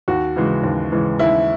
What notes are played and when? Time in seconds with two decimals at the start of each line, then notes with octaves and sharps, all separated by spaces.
0.08 D#2 F#4
0.36 C#3 E3 G#3
0.63 D#2
0.92 C#3 E3 G#3
1.19 D#2 E4